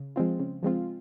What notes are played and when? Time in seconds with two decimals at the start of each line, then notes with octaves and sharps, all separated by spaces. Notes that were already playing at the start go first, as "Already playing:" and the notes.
Already playing: C#3
0.16 F3 G#3 C4 F4
0.39 C#3
0.63 F3 G#3 C4 F4